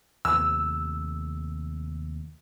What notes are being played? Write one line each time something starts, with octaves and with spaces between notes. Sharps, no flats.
D#2 C3 A3 E6